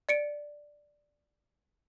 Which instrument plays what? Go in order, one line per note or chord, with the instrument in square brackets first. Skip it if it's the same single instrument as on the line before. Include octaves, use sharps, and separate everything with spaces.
[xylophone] D5 C#7 D7